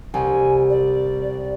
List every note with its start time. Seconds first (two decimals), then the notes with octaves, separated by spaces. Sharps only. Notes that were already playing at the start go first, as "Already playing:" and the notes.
0.14 C2 G#5
0.70 D5